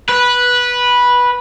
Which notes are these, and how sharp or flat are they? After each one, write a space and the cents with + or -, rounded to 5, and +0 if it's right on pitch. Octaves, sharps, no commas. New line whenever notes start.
B4 -10